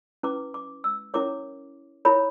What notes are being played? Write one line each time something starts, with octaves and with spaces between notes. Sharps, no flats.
C#4 E4 B4 D6
D6
E6
C#4 E4 A#4 C#5 D6
E4 A#4 C#5 B5